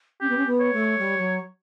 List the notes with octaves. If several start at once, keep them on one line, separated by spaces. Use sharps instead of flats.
C#4 G4
B3
C#4
B3
C#5
A3
G3
F#3